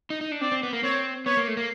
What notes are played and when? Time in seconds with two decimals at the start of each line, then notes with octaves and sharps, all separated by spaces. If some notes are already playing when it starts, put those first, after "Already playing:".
0.10 D#4
0.21 D#4
0.31 D4
0.41 C4 D5
0.52 C4
0.63 B3
0.73 A#3
0.83 C4 C#5
1.26 B3 C#5
1.37 A#3
1.48 A3
1.57 A#3